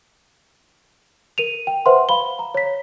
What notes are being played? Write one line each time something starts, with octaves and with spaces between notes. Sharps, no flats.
A#4 D#7 F7
G5
B4 C5 E5 F#5 C6
F5 B5 G7
A#5
C#5 B6